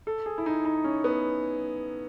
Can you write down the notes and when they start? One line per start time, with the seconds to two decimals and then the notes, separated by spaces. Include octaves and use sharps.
0.07 A4
0.26 G#4
0.38 E4
0.46 D#4
0.65 D#4
0.84 C#4
1.04 B3